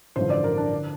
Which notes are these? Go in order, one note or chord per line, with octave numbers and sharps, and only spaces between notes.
A1 G2 D3 F3 C5
D5
A#4
D4
D3